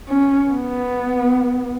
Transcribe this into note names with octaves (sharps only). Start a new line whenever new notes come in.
C#4
B3